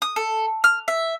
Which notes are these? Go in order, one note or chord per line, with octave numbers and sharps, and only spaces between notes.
D#6
A4
F6
E5